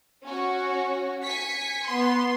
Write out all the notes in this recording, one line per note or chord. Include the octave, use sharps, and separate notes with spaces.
C#4 F#4
G#5 B6 C#7
B3 C6